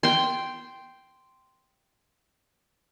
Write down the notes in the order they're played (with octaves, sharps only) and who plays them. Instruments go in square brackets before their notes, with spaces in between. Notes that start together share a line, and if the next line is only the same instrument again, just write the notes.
[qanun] G5 C6